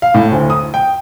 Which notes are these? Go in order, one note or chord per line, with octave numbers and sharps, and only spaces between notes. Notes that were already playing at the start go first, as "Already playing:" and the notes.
F5
A2
D2
D#6
G5